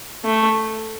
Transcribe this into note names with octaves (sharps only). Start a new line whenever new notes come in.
A3